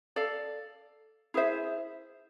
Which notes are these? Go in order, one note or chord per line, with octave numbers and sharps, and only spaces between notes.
A4 D5 F5
E4 G#4 C5 E5